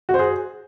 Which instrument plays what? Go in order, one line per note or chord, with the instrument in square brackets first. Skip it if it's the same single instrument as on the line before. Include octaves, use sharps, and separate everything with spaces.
[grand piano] F#4
C5
G#4